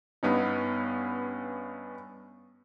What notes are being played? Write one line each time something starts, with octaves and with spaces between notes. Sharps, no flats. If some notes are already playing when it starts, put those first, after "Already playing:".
G2 B3 C#4 D#4